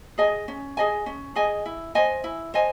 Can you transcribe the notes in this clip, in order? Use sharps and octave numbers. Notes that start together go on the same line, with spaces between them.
G#4 D#5 G#5
C#4
G#4 D#5 G#5
C#4
G#4 D#5 G#5
E4
C5 D#5 G#5
E4
C5 D#5 G#5